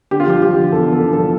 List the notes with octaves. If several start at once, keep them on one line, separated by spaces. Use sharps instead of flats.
D3 G4
F4
F3 G4
F3 G4
D3
E2 A4
D3 A4
D3
F3 A4